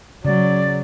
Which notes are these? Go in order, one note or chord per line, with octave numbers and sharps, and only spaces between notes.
C#3 F#3 D5